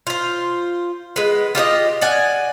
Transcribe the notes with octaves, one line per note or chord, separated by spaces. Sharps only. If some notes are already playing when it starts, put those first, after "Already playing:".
F4 C5
G#3 B3
F4 G4 C5 D#5
D5 F#5 G#5